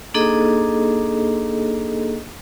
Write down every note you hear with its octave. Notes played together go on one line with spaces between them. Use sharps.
A#3 D4 D#4 G#4 A4 D#5